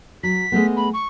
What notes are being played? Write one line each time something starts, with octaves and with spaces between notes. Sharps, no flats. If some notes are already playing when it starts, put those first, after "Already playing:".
F#3 B6
G#3 A3 B3
B5
C#6